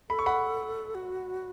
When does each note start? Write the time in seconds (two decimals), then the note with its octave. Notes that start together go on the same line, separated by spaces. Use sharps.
0.09 A4 B5
0.19 C#6
0.26 F#5 B5
0.95 F#4